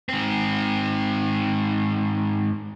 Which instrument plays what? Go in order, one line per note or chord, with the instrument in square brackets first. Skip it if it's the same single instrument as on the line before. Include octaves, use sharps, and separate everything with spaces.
[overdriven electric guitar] G#2 C4